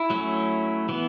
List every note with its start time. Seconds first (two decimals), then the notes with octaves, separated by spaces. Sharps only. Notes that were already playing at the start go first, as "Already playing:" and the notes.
Already playing: E4
0.10 F#3 A3 C#4
0.89 E3 B3